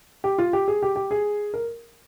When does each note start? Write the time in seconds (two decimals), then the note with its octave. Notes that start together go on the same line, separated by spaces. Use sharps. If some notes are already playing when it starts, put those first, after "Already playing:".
0.24 G4
0.38 F4
0.53 G4
0.68 G#4
0.83 G4
0.96 G4
1.11 G#4
1.54 A#4